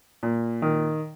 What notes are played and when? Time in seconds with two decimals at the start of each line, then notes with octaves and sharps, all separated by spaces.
0.23 A#2
0.62 D#3